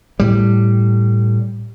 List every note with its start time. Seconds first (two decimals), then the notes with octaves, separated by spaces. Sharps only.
0.20 A2 G3